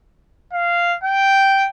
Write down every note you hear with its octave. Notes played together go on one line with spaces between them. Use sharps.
F5
G5